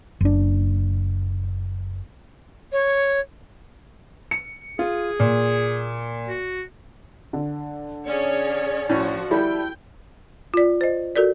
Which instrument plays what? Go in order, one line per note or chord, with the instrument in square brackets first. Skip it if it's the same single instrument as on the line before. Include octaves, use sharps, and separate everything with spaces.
[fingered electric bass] F#1 D4
[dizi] C#5
[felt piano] C#7
[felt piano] F4 [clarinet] G#4
[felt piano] A#2
[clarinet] F#4
[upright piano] D3
[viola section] C#4 G#4 C#5 [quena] D5
[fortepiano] A2 C#4 [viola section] F3 F#4
[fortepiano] G3 [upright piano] E4 A4 [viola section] G5
[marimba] F4 D5
C5 D#5
F#4 A4 A#4 D5